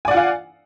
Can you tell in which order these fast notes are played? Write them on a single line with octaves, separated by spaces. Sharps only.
G#5 D5 F#5 F4 F5